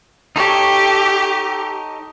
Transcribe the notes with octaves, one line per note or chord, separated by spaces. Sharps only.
D#4 G4 A4 C#5